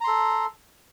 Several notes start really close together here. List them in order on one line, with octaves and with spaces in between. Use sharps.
A#5 C6 A4